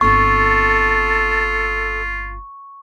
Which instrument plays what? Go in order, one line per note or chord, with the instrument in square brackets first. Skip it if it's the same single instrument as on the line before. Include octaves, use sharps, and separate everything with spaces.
[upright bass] G1 C4 [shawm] F4 [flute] A4 [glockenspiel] C#6